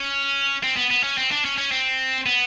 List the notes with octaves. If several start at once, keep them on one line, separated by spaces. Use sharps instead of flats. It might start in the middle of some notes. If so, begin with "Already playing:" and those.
Already playing: C#4
C4
B3
B3
C#4
C4
D4
C#4
C#4
C4
B3